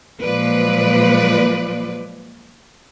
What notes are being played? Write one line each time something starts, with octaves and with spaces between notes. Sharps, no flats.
A#2 F3 F#3 G#3 B4 D5